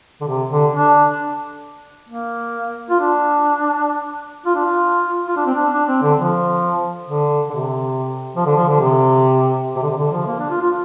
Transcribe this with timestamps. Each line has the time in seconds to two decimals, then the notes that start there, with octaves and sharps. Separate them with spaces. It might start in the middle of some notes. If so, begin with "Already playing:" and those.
0.21 D3
0.28 C3
0.51 D3
0.73 D4
2.09 A#3
2.90 F4
3.00 D4
4.46 F4
4.55 D4
4.66 F4
5.28 F4
5.37 D4
5.46 C4
5.55 D4
5.73 D4
5.88 C4
6.03 D3
6.18 F3
7.09 D3
7.50 D3
7.55 C3
8.36 F3
8.46 D3
8.57 F3
8.69 D3
8.80 C3
9.76 C3
9.82 D3
9.91 C3
9.98 D3
10.12 F3
10.27 A#3
10.39 D4
10.50 F4
10.61 F4